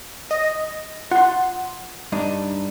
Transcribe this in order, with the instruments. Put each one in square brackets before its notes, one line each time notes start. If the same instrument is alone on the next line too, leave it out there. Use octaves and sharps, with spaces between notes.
[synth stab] D#5
[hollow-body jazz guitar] F4 C6 [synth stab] F#5
[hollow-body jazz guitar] G2 D4 D#4